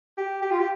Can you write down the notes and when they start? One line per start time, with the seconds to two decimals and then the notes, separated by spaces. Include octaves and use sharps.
0.18 G4
0.42 G4
0.51 F4
0.59 G4